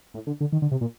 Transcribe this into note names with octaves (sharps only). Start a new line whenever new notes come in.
A2
D3
D3
D#3
D3
C3
A#2